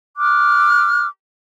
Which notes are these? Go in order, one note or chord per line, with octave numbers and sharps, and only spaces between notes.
D6 F6 F#6